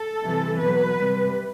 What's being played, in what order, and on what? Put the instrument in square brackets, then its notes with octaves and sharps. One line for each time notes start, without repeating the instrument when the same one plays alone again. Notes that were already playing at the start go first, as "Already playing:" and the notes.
Already playing: [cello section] A4
C3 E3 G3
B2 F#3 B4
C3 G3